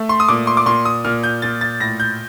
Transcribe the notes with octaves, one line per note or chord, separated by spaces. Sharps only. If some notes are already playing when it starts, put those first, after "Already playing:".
Already playing: A3
C6
D#6
A#2 D6
C6
D6
A#2 C6
D#6
A#2 F6
G6
A#2 A6
A6
A2 A#6
G6